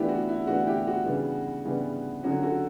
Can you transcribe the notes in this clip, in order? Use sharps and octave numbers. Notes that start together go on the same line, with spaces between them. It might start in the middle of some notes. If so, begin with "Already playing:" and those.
Already playing: A2 E3 B3 D4 E4 G4
F#4
E4
A2 E3 B3 D4 F#4
E4 G4
F#4
C#3 E3 G3 B3 D4
C#3 E3 G3 B3 D4
D3 F#3 C#4 F#4
F#4 A4